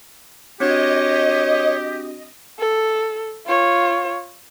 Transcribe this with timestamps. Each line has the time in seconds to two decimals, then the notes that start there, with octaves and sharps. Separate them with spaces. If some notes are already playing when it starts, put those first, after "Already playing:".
0.60 C4 D4 F#4 G4 C#5 D#5
2.60 A4
3.47 F4 C#5